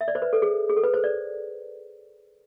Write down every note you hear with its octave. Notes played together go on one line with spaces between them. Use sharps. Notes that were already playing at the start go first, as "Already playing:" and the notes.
E5
D5
C5
B4
A4
G#4
G#4
A4
B4
C5
D5